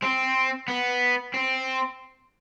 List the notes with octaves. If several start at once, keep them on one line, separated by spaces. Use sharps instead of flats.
C4
B3
C4